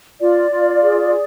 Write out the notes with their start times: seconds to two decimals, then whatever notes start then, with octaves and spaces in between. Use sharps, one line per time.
0.20 F4 D5
0.51 F4
0.81 G#4